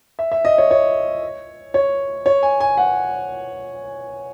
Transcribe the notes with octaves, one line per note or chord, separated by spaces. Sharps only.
E5
E5
D#5
C#5
C#5
C#5
C#5
G#5
G#5
F#5